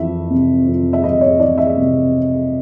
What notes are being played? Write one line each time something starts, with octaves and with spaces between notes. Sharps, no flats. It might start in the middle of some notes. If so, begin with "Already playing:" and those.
Already playing: F2 E3 E5
C3
F2
E5
F2 D#5
C#5
E3 D5
E5
C3